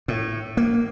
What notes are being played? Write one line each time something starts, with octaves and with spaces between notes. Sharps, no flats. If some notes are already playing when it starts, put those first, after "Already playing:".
A2
A#3